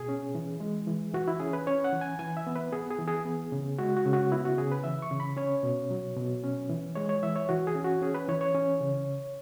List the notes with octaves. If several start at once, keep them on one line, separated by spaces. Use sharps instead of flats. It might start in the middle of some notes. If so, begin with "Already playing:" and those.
Already playing: B2 G#4
C#4
E3
G#3
E3
E3 F#4
E4
C#4 G#4
B4
C#4 C#5
F#5
E3
G#5
E3 G#5
E5
B3
B4
B3 G#4
G#4
E3
G#4
B3
C#3
G#3 F#4
F#4
C#3
F#4
B3 E4
F#4
C#3 G#4
B4
E3 E5
C#6
C#3
B5
C#4 C#5
B2
F#3
B2
C#4
E3
G#3 C#5
C#5
E3 E5
C#5
E3 F#4
G#4
C#4
F#4
C#4 G#4
B4
E3 C#5
C#5
C#4
C#3